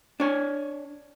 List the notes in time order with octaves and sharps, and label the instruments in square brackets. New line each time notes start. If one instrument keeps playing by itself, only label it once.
[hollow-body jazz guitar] D4 C#5